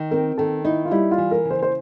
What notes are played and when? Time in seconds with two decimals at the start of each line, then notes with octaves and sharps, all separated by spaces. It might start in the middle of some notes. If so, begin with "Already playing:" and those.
Already playing: D#3
0.11 C4 A#4
0.38 D#3 A4
0.64 D#4 E4
0.85 F4
0.91 G3 E4
1.11 F4
1.18 E3
1.31 A#4
1.45 C#3
1.51 C5
1.62 C5